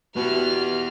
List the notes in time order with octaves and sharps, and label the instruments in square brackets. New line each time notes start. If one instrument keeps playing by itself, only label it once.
[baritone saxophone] B2 [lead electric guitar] B3 E4 [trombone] G4 [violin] F6